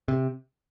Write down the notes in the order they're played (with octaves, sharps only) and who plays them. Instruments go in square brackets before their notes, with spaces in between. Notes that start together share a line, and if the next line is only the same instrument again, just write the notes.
[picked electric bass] C3